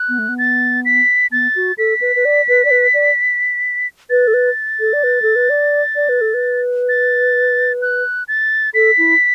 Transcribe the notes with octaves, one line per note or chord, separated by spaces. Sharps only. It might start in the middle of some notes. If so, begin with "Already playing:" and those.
Already playing: F#6
B3
A3
B3
A6
B6
B3 A6
F#4
A4 B6
B4
B4
D5
B4
D5
B4
D5
B4 A6
A4
B4
A4
D5
B4
A4
B4
D5
D5
B4
A4
B4
A6
F#6
A6
A4 B6
E4